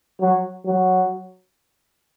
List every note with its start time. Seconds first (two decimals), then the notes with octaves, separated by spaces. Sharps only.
0.21 F#3
0.66 F#3